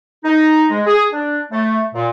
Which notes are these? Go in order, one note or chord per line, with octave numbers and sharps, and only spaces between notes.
D#4
G#3
G#4
D4
A3
A#2